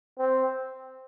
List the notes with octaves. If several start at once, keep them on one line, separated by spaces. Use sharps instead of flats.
C4